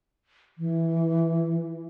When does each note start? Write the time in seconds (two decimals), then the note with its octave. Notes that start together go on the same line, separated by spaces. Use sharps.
0.58 E3